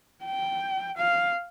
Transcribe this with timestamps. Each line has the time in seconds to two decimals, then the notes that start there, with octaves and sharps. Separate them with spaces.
0.25 G5
0.97 F5